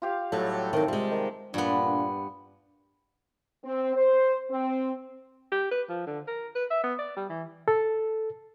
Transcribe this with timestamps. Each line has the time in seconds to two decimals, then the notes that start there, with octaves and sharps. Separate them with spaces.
0.02 F4 G4 F5
0.32 A2 F#3 G3 A4
0.73 C3 D#3 F#3
0.88 G3 G#3 F4
1.12 D#3
1.54 G2 A#2 B3 D4 F4
3.65 C4
3.96 C5
4.51 C4
5.52 G4
5.71 B4
5.89 F3
6.07 D3
6.27 A#4
6.55 B4
6.70 E5
6.84 B3
6.99 D5
7.16 G3
7.29 E3
7.68 A4